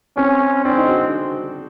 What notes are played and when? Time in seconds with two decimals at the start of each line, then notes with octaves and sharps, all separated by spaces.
0.17 C4 C#4
0.65 C4 D4
0.77 D#4
0.89 F#4